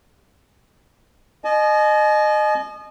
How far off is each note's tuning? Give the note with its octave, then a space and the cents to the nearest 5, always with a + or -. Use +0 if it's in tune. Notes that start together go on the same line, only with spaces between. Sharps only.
D#5 -25 G#5 +45